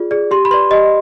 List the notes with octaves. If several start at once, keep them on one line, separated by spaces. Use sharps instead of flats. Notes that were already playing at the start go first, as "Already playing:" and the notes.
Already playing: F4 G#4 D5
G#4 D5
G4 C6
B5
B4 D5 C6
G4 D#5